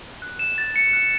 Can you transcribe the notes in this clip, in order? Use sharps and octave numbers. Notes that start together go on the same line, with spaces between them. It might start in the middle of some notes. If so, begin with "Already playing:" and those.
F#6
E7
A6
C#7
F#6